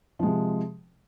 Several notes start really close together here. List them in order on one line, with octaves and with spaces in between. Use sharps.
F3 G#3 C3